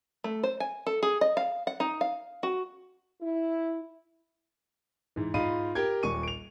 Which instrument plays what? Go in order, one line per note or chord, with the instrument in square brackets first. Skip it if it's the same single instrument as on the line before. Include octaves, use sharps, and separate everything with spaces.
[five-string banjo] A3
C5
G#5
A4
G#4
D#5
F5
F#5
D#4
F5
F#4
[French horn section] E4
[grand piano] G#2 E3
G#2 F4 D#5 F5 B5 D#7
G4 A#4 G5 G#6
D#1 C#6 D#7
D7 F7